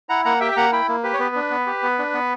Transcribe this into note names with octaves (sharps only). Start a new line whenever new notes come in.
E4 F#5 A#5
A#3 F#5 A#5
G4 E5 G5
G5
A#3 F#5 A#5
E4 G5 B5
A#3
G4 B4
C#5
B3 B4
D4
B3
G4
B3
D4
B3